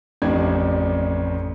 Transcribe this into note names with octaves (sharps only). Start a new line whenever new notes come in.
A1 F2 A2 D4 D5 G#6